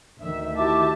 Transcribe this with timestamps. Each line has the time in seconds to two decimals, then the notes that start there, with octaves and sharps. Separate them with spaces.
0.21 D2 D#3 E5
0.56 E4 F#4 G4 E5 A5 D6